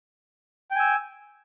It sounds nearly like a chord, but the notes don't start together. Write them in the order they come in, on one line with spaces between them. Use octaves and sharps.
G5 G#5 E6